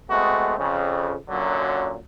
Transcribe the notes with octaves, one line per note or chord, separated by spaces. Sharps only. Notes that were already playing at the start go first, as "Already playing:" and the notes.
G#3 A3 B3 C4 F#4
F2 C#3
F#2 A#2 D3 F#3